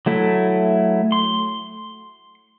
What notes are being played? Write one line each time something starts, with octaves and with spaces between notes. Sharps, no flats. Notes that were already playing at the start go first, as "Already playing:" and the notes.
F#3 A3 E4
C6